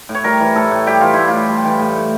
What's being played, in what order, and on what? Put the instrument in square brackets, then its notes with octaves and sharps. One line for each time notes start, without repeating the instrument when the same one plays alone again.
[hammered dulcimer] A2
C#5
G3 A#4
E3
A2 A4
A2
G3 G4
E3 F4
A2 E4
F4
A2
G3
E3
A2
A2